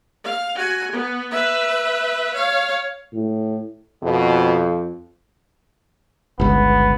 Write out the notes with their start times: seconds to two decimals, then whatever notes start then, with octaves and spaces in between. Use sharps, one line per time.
0.24 F5
0.55 F#4 G#5
0.91 B3
1.31 B4 E5
2.34 C#5 F5
3.13 A2
4.03 F2 B2
6.40 G1 C#2 B3